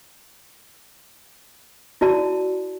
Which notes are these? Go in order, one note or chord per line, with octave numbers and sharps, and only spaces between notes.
E4 F#4 D5 A5